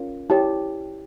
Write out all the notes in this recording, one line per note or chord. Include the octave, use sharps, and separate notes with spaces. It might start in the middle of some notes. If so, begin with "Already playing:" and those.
Already playing: C#4 F4 A#4
E4 G4 C#5 A5